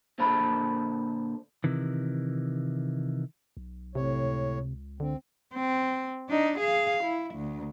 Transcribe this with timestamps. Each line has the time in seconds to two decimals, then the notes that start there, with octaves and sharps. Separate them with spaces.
0.19 A#2 D3 C5 A5 B5
1.64 C3 D#3 E3
3.57 B1
3.95 A2 C3 C#5
4.24 C#2
5.00 D3 C4
5.54 C4
6.29 D4 D#4
6.59 G#4 F5
7.04 E4
7.35 D2